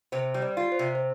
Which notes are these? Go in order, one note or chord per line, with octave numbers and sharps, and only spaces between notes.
C3 C5
G3
D5
F4
C5
C3
C5